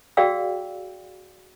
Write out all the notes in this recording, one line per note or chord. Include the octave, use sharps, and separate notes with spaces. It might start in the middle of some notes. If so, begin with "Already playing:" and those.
F#4 G#4 D5 F5 G5 E6